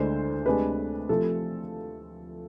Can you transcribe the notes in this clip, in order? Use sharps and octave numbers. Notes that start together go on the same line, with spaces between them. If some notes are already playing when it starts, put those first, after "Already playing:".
Already playing: D2 D3 G#3 D4 C5
D2 C3 G#3 D4 B4
C3 F3 A3 A4